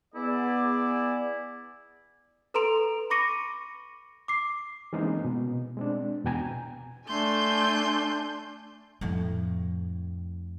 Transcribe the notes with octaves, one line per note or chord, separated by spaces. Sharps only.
B3 E4 G#4 D5
A4 B4 A#5 C6 D7 F7
B5 C#6 D6 A#6 C#7 D#7
D6 C7
E3 G#3 A#3 C4 C#4 D#4
B2
G#3 C4 D4
E2 B2 G5 G#5 A#5
A3 D4 G#5 C6 G6
F2 A2